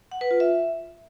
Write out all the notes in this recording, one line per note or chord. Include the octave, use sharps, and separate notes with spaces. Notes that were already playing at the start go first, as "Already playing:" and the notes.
F#5
B4
F4
E5